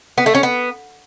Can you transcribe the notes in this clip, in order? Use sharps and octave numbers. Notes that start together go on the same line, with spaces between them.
B3
A3
C#4
B3